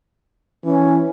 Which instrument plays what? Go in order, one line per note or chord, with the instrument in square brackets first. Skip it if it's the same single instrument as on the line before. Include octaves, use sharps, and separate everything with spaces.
[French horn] E3 [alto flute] C#4